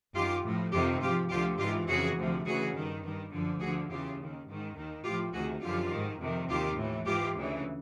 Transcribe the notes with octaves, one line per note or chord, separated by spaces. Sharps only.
F#2 D#3 F4 G4
A2 F3
F2 C3 D#3 F4 G4
G#2 F3 F4 G4
D2 D3 F3 F4 G4
G#2 E3 F4 G4
F2 C#3 E3 F#4 G#4
D2 C3 F3
D2 C#3 E3 F#4 G#4
G2 D#3
G2 D#3
F#2 D3 F3
D2 D3 F3 F#4 G#4
E2 C#3 E3 F4 G4
D#2 D#3
G#2 D#3
D#2 D#3
A2 F3 F4 G4
D2 C3 D#3 F#4 G#4
F#2 D3 F3 F4 G4
G#2 D#3
F2 C3 D#3
D#2 D#3 F4 G4
A2 E3
G#2 E3 F4 G4
D2 C#3 E3